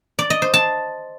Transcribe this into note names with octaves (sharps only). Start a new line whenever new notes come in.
D5
D#5
C5
A5